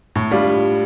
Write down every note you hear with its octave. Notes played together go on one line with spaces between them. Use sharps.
A2
G3 D4 F4